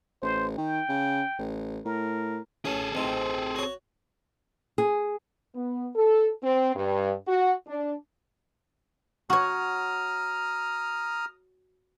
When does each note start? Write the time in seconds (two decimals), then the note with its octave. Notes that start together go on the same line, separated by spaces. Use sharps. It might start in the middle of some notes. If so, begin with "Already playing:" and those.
0.22 A1 C5
0.58 D#3 G5
0.89 C#3
1.39 A1
1.85 A2 A#4
2.65 A1 C#4 G#4 A4
2.95 A1 C4 D#4
3.56 F#4 C#5
4.78 G#4
5.56 B3
5.96 A4
6.43 C4
6.75 G2
7.28 F#4
7.67 D4
9.30 F#4 C#5 A#5 D#6 F6